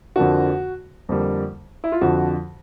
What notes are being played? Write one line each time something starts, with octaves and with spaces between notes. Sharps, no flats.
F2 D3 F3 A#3 D4 F#4
F2 D3 G3 A#3
E4
F4
F2 D3 F3 F#4